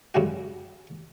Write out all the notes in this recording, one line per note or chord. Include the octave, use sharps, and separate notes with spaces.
F#2 D3 G3 G#3 F#4